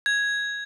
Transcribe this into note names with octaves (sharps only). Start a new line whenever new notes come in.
G#6